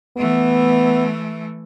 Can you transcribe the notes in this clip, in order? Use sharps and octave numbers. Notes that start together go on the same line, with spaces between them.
E3 A3 B3